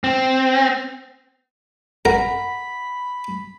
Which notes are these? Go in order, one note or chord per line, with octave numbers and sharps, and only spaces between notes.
C4
A#4 F#5 B5